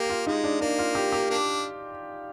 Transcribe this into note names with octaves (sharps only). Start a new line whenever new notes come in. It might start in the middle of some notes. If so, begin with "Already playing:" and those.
Already playing: A#3 G4
F4
G#3 D#4
D4
A#3 D4
F4
G4
G4
A#3 D4